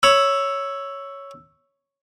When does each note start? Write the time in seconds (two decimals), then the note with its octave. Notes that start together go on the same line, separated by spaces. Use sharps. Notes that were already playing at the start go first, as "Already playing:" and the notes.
0.03 C#5 B5 E6